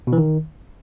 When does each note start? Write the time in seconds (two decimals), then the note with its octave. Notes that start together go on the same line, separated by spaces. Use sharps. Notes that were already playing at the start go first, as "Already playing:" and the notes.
0.07 B2
0.13 E3
0.18 D#3